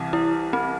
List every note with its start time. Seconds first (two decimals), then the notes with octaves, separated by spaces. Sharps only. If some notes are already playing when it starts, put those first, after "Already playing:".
Already playing: C2 C3 E3
0.13 E4
0.53 C4